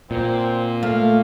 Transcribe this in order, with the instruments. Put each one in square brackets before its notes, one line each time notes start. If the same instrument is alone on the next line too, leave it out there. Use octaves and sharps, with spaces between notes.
[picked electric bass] A#2 [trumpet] C4
[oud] A3 [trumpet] F5